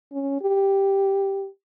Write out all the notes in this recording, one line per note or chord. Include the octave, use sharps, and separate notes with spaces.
C#4
G4